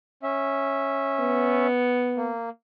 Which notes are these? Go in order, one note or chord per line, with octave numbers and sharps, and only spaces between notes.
C#4 E5
B3
A#3